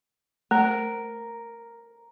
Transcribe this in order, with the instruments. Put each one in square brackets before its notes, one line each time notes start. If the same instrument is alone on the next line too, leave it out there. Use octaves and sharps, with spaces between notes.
[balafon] A3 [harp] A#4